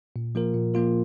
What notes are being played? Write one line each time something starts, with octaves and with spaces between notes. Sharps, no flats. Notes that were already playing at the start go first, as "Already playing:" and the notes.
A#2
F3 A#3 F4 A#4
A#2
F3 A#3 F4 A#4